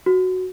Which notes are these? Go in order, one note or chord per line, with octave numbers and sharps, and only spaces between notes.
F#4